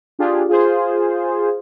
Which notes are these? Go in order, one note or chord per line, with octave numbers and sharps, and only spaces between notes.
D4 F4 G4 G#4
F4 G#4 C5